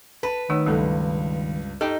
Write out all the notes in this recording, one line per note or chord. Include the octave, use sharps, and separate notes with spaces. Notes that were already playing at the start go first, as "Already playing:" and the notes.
B4 A5
D#3 A3 D#4 C#5 E6
C#2 G2 F#3 A3 A4
D#4 G4 A4 G5